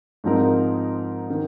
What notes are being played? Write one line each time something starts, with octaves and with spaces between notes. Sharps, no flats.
G#2 F3 C4 D#4 A#4
D#3